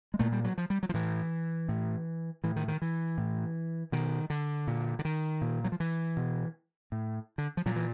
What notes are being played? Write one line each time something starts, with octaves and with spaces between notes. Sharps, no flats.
G#3
A#2 A3
G3
F#3
F3
G3
F#3
F3
A2 E3
A2
A2 E3
D#3
D#3
E3
A2
B2 D#3
D3
A#2
D3
D#3
A#2
F#3
F3
E3
B2
A2
D3
F3
A#2 F#3
E3